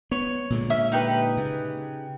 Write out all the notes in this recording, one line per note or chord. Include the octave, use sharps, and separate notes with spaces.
B3 C#5
A#2 D3 G#3
C#4 E5
D#4 G4 B4
C#3